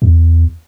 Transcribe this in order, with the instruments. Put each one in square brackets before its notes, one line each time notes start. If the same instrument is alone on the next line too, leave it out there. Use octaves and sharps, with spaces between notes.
[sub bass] E2